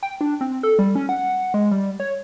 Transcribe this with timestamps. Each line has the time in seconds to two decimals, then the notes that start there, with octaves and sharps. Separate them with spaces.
0.03 G5
0.21 D4
0.41 C4
0.63 A4
0.79 G3
0.95 C#4
1.09 F#5
1.54 G#3
1.71 G3
2.00 C#5